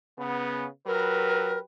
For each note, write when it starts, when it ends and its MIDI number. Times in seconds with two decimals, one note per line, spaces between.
0.18 0.65 49
0.18 0.65 59
0.87 1.60 54
0.87 1.60 67
0.87 1.59 70
0.87 1.60 71